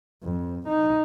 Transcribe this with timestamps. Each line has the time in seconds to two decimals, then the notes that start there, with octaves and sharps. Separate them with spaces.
0.24 F2
0.68 D#4